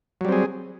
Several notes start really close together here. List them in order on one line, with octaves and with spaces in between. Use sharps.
F#3 G3 C4 G#4